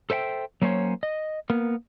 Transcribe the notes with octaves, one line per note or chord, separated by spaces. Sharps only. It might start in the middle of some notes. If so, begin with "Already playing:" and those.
A4 C5 E5 F#5 G5
F#3 A#3 C#4 C5 C#5
D#5
A#3 B3 A#4